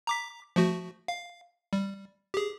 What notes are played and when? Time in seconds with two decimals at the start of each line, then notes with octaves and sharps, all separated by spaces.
0.07 A#5 D6 B6
0.56 F3 A3 F#4
1.08 F5
1.73 G3
2.34 G4 G#4